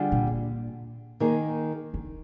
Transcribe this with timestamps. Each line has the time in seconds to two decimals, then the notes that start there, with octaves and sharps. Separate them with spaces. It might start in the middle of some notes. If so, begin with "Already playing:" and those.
Already playing: D3 G3 D4 F4 G#4
0.12 A#2
1.20 D#3 A#3 D#4 G#4
1.94 D3